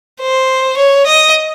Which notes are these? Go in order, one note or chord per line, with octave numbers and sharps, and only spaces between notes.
C5
C#5
D#5